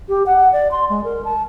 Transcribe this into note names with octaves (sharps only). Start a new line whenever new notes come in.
G4
F#5
D5
C6
G#3
A#4
A5